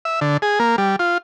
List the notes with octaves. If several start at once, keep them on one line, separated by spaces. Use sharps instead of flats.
E5
D3
G#4
A#3
G3
F4